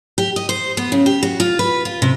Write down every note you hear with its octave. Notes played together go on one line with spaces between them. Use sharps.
G4
D#5
C5
B3
C#3
G4
F#4
F4
B4
F4
C3